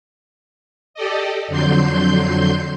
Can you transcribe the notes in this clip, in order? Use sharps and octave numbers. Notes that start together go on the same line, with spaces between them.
G4 A4 D5 D#5
F2 D3 F#3 C6 G6